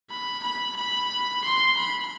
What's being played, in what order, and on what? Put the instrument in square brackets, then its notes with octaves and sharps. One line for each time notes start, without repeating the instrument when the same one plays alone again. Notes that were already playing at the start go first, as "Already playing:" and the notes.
[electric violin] B5
B5
B5
C6
B5